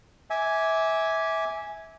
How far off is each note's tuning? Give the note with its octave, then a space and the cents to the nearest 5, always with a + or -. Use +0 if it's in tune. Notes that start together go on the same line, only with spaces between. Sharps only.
E5 -20 G#5 +0 D6 -10